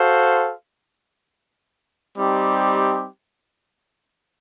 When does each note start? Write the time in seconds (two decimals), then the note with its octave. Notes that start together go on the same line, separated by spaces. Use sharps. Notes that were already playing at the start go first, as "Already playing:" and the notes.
Already playing: F#4 A4 C5 F5
2.18 G3 C4 D#4 G4